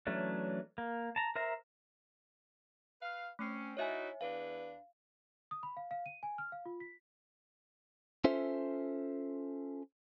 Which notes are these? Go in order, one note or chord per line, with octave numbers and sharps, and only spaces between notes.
E3 F#3 A3 C#4 D4
A#3
A5 A#5
A#4 C5 E5 A#5
B4 F5
A3 C4 C#4 C7
D#4 E4 F#4 C#5 E5 G#5
E2 D4 B4 F5
D#6
B5
F5
F5
D#7
G#5
F6
F5
F4
B6
C#4 F4 A4 C5 E5